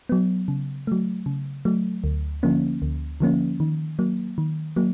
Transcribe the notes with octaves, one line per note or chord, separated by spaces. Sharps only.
F#3 B3
C#3
F#3 A3
C#3
F#3 A3
D2
D3 F3 A#3 C#4
D2
D3 F3 A#3 C#4
D#3
F#3 A#3
D#3
F#3 A#3